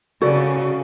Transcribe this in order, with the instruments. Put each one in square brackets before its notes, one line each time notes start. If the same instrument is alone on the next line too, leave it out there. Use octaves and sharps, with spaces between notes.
[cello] C#3 [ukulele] F#4 A4 D5